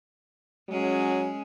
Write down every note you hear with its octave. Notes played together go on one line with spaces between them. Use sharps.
F#3 G#3 C#4 G#4